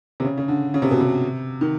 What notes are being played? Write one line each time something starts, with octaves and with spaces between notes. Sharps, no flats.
C3
C#3
C#3
D3
C#3
C3
B2
C3
D#3